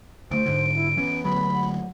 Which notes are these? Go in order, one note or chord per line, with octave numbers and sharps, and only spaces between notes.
D2 A3 C5 D7
G#2 D3
E4
E3 B3 C#4
D2 F#3 G#3 B5
F#5